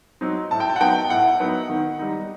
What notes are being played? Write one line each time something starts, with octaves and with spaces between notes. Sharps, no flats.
F#3 C4 D#4
A2 A5
G5
A5
F#5
F#3 B3 D#4 G5
A2 F#5
F#3 B3 D#4
D#3
G3 D#4